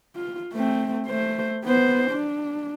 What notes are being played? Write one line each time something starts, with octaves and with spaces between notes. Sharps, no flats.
F4
A3 C4
A3 C5
B3 C5
D4